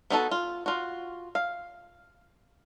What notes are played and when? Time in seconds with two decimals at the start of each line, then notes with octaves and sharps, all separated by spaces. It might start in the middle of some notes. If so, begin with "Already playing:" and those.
0.10 B3 D4 D#4 F#4 A4
0.31 F4
0.66 F4 F#4
1.35 F5